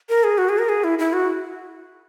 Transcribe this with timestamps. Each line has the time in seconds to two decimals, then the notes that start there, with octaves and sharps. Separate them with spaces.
0.09 A#4
0.24 G#4
0.38 F#4
0.49 G#4
0.58 A#4
0.69 G#4
0.84 E4
0.99 E4
1.13 F#4